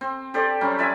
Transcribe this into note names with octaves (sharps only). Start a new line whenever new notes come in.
C4
G4 A4 C5 D5
F#3 G3 C4 C#4
B4 D5 E5 G#5